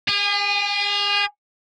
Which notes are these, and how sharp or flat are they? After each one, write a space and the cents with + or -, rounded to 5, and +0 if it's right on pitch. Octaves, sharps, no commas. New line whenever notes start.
G#4 -45 G#5 -15